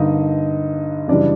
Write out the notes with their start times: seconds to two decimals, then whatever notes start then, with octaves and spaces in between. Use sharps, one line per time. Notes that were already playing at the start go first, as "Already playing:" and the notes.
Already playing: G2 D3 G3 A#3 D#4 D#5
1.08 F#2 C#3 E3 G3 D4 D5